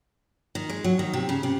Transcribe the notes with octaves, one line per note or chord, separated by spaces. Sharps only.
D#3
G#3
F#3
D#3
C3
C#3
C3